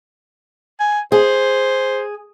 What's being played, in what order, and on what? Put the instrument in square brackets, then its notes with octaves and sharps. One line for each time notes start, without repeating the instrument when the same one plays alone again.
[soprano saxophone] G#5
[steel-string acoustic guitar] G#4 [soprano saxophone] C5